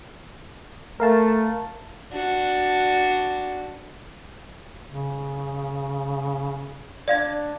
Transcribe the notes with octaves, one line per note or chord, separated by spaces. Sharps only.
A3 A#4 F5 A5
D4 F#4
C#3
D4 D5 F5 G#6